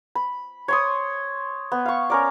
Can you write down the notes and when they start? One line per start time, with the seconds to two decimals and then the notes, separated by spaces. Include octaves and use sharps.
0.15 B5
0.68 C#5 C6 D#6
1.72 B3
1.86 F5 C#6
2.10 C#4 A#4 D5